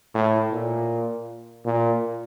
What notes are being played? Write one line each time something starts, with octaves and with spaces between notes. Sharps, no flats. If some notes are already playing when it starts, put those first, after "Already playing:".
A2
A#2
A#2